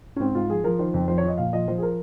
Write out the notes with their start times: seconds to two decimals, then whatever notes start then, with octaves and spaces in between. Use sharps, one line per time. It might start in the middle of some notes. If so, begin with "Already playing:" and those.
0.16 C#4
0.20 G#2 C4
0.35 G#2 F4
0.49 F3 G#4
0.64 F3 A#4
0.79 D#3 C5
0.94 F2
1.08 F3 C5
1.18 C#5
1.23 F3 D#5
1.38 A#2 F5
1.53 F3 D#5
1.68 F3 C5
1.78 G#4
1.82 A#4